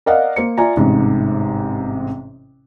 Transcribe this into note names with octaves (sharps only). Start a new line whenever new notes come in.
A#4 D5 D#5 F5 F#5
A#3 C5 C#7
F4 D5 E5 G#5 A#5
A1 G#2 C3